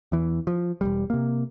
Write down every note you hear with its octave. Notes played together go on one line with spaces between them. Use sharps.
E2 E3
F3
E1 C#2 G3
C3 A#3